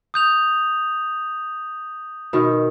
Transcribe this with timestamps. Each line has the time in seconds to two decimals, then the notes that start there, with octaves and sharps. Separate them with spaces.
0.14 D#6 G6 F7
2.33 B2 D#3